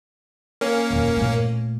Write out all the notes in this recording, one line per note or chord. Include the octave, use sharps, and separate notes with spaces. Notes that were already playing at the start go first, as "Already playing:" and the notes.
A#3 C#4
D#1 F2
A#2 A3